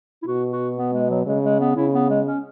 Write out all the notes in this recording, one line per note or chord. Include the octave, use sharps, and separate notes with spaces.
E4
B2 F#4
F#4
B3
G#3
F#3
C#3 G#3
G#3
B3
C#3 E4
B3
G#3
C#4